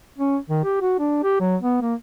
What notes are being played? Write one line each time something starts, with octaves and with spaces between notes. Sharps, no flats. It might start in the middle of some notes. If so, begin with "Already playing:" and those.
C#4
D#3
G4
F#4
D4
G4
F#3
B3
A#3